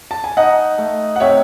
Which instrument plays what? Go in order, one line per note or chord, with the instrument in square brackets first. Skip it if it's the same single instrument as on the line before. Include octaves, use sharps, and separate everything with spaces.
[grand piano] A5
G#5
[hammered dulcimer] D#4 [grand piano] D#5 F#5
[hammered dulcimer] A3
[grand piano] F#5
[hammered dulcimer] C3 [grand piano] C#5 E5